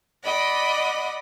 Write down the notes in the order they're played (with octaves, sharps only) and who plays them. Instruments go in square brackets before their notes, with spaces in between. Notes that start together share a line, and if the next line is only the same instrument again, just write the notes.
[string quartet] D5 D#5 F#5 B5